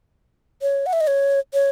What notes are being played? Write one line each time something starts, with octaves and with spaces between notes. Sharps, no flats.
C#5
F#5
E5
D#5
C#5
C#5